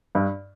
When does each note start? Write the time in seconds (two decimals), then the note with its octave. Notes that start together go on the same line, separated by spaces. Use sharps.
0.15 G2